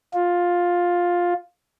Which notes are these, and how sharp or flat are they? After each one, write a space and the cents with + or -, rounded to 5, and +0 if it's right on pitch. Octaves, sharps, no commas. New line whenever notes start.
F4 +10